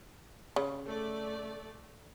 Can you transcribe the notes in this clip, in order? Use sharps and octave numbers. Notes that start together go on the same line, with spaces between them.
C#3
A3 D5